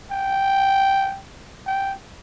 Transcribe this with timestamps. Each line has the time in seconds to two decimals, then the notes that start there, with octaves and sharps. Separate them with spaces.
0.12 G5
1.67 G5